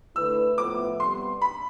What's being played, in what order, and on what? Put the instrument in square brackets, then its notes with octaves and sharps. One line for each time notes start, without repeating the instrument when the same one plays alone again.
[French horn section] D3 A3 E4 B4 [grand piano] E6
[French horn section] A2 F3 B3 E4 B4 [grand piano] D6
[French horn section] C3 G3 B3 [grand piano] C6
[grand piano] B5